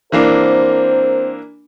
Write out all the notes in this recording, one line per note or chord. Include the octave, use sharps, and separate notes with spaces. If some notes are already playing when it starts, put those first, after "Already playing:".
E3 A#3 C4 D4 A#4 C5